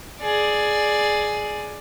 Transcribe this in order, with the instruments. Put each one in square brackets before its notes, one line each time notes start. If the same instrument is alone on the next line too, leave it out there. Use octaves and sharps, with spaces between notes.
[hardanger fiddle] G#4 D5